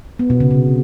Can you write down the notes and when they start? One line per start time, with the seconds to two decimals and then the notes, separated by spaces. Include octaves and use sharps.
0.19 B3
0.30 B2
0.40 C#3
0.51 C3